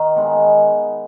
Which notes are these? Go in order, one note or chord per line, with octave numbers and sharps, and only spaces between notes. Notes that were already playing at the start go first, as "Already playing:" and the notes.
Already playing: D#3
G#3 B3 D#4